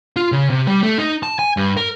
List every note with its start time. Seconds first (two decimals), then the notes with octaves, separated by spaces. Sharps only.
0.16 F4
0.32 C#3
0.50 C3
0.67 G3
0.83 A3
0.98 D#4
1.23 A5
1.39 G#5
1.57 G2
1.77 A#4